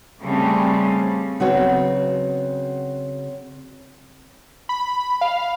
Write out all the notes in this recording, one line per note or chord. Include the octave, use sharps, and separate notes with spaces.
C#3 G3 A3 C4 C#4
C#3 F#3 B3 C4 F#4 C#5
B5
F5